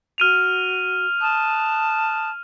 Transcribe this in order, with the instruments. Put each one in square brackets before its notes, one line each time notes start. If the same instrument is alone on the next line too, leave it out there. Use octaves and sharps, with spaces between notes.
[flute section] F#4 [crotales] F6 D#7 F7
[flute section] A5 D#6 F#6